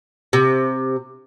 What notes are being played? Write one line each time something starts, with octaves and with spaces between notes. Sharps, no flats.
C3